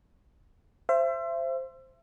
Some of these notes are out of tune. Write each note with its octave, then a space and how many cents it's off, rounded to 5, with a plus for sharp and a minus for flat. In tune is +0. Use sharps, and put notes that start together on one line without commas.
C5 +5 E5 +35